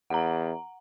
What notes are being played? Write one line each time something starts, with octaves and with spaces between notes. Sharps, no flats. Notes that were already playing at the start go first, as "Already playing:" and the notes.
E2 F#5 A#5